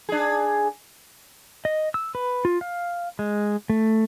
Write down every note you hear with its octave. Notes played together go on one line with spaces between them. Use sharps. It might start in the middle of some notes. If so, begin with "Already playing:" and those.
D4 G#4
D#5
E6
B4
F4
F5
G#3
A3